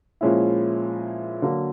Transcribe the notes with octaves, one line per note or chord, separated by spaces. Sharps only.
A#2 F3 G#3 C#4 E4
D3 F#3 A#3